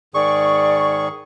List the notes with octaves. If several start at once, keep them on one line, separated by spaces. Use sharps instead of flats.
G#2 D#3 G#4 D5 C#6